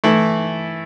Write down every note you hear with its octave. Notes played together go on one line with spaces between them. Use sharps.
E3 A3 E4